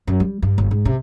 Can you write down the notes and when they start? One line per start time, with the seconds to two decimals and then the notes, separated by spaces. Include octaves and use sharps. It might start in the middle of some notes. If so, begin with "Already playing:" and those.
0.07 F#2
0.20 G3
0.42 G2
0.58 G1
0.71 G#2
0.85 C3